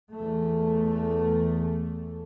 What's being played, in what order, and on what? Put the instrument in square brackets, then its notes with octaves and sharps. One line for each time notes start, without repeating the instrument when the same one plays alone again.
[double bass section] E2 A3